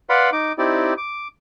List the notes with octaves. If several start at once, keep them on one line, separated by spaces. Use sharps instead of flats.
B4 D5 F5 F#5 B5 C6
D#4 D6
C4 D#4 E4 G4 D5
D6